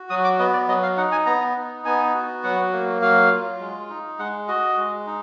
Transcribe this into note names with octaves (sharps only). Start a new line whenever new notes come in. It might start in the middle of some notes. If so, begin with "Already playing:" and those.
Already playing: F#4
F#3 D#6
D6
B3 D#5
D5
F#3 D#5
F5
D#4 F#5
G#5
B3 A#5
D#4
B3 G#5
F#4
F#3 F#5
A#3
F#3 F5
F4
G#3
D#4
G#3 F#5
F#4 D#5
G#3
D#4